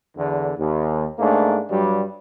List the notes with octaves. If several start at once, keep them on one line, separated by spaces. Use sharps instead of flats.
E2 D3
D#2
G#2 A3 A#3 D4
G2 F#3 G3